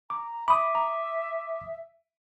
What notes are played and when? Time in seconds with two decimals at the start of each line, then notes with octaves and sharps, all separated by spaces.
0.10 A#5 D6
0.48 E5 B5 D6 D#6
0.75 A#5